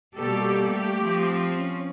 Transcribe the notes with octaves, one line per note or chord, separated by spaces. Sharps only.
B2 G3 A#3 G4 A4
A3 G4
F3 C4
C#4